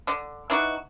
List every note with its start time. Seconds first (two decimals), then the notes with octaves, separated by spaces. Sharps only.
0.07 D3 D4
0.50 E3 D4 D#4 F#4